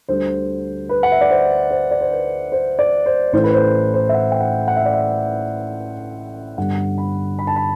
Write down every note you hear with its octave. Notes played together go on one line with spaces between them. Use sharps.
D2 D3 G3 C5
B4
F#5
E5
D5
C5
C5
D5
C5
B4
C5
D5
C5
A1 A2 E3 A3 C5
B4
C5
C5
E5
F#5
G5
F#5
F#5
E5
D5
E5
G1 G2 D3 G3 F#5
B5
B5
A5
B5